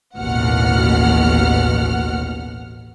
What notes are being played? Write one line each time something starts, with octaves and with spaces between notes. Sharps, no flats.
A1 D#2 B2 F#5 F6